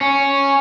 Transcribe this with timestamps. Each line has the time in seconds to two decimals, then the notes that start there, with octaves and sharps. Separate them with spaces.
0.01 C#4